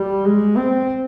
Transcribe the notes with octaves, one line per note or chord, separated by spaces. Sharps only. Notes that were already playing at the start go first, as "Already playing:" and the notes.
Already playing: G3
G#3
C4